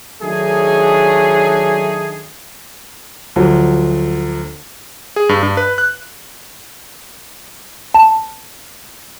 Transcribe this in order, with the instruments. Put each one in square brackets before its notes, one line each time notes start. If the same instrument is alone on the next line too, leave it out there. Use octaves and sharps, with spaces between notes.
[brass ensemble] D#3 F#3 A3 D4 D#4 G#4
[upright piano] D2 F3 F#3
[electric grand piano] G#4
G2
G2
B4
F#6
[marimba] A5